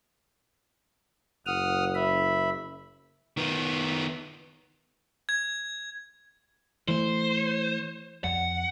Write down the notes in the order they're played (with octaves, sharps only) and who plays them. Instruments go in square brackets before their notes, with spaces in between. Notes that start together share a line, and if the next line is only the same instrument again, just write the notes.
[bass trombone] F#1 [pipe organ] F#5 D#6 F6
[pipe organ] E5 B5
[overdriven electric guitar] D#3 B3
[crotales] G#6
[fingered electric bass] E3 A3 [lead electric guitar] C5
[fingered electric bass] F2 [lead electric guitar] F#5